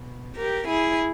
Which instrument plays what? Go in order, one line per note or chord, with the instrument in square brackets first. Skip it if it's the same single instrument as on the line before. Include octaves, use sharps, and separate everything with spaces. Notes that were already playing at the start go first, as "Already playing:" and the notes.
Already playing: [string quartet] B2
G4 A#4
E4 G#4